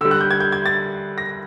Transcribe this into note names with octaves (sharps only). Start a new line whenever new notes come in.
D3 G3 E6
F#6
G6
G#6
G6
G#6
A6
A#6